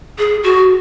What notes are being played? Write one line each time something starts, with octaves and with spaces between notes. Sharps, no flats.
G#4
F#4